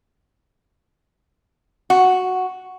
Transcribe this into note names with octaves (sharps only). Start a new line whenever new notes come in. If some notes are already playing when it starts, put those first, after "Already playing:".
F#4